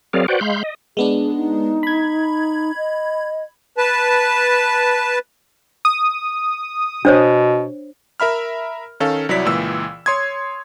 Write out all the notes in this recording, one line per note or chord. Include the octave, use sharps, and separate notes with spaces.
F#3 C4 G#4 A#4 D5 F5
F#4 B4 C5 D5 F#5 G5
G#3 F5 B5 C6 G6
D#5
G#3 B3 D4 G#4
D#4
B5 G#6
D#5
B4 A5
D#6
B2 D4 C5 C#5
A#4 E5 B5 F6
D#3 C#4 A4 F5
C2 F#3 E4 C#5 D5 B6
C#2 A#2 E3 E6
C#5 C6 D#6 G#6